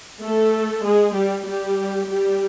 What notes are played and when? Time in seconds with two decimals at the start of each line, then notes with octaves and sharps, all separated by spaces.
0.22 A3 A4
0.84 G#3 G#4
1.15 G3 G4
1.46 G3 G4
2.08 G3 G4